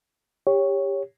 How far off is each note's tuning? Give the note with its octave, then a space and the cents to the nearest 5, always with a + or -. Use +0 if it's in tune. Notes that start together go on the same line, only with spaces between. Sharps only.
G4 +20 C#5 +0